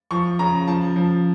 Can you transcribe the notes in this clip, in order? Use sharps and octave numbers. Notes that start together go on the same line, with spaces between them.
F3 C#6
C#3 A#5
F3 A5
F3